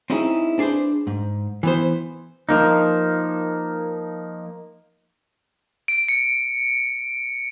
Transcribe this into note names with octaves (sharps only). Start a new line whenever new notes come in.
C4 C#4 D#4 E4 G#4
D4 G#4 B4 C5
G#2
E3 B3 C5
F3 A#3 D#4
D7
C#7